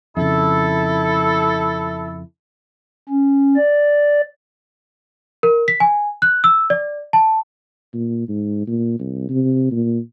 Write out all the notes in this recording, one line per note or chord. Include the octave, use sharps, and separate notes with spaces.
F2 C#3 E4 A4
C#4
D5
A#4
B6
G#5
F#6
E6
D5
A5
A#2
G#2
A#2
C2
C3
A#2